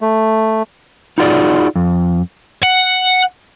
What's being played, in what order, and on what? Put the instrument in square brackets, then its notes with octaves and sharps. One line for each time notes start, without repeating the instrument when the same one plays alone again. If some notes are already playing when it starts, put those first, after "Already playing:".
[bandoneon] A3
[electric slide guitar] D#4 F4 F#4 G#4 C#5 D5
F2
[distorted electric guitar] F#5